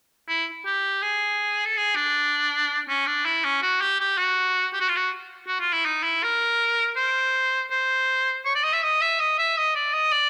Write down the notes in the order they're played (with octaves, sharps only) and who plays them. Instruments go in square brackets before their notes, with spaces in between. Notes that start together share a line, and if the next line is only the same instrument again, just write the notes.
[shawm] E4
G4
G#4
A4
G#4
D4
C#4
D4
E4
C#4
F#4
G4
G4
F#4
G4
F#4
F4
F#4
F#4
F4
E4
D#4
E4
A#4
C5
C5
C#5
D5
D#5
E5
D#5
E5
D#5
E5
D#5
D5
D#5
D5